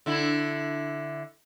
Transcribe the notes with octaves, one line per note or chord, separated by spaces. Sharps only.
D3 E4